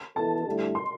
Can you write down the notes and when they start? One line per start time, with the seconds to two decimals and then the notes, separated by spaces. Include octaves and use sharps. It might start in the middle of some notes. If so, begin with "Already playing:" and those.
0.16 E3 B3 E4 A4 A5
0.46 G2 D3 A3 E4 G4
0.75 C6